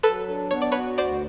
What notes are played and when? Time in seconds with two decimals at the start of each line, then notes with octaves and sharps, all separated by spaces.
0.03 F#3 A4 B4
0.28 D4
0.51 B3 C#5
0.62 D5
0.72 F#4 B4 C#5
0.98 D2 C5 D5